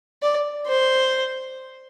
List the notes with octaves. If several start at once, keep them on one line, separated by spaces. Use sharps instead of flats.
D5
C5